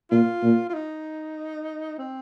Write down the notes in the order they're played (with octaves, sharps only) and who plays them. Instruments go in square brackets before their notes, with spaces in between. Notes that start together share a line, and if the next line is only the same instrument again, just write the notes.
[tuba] A#2 [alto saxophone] F4
[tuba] A#2
[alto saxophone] F4
D#4
C4